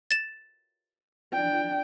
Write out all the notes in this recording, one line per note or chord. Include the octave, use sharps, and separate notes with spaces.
A6 E7
D4 G5